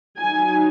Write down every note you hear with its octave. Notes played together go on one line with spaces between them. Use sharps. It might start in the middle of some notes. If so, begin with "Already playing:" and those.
F#3 D#4 G#5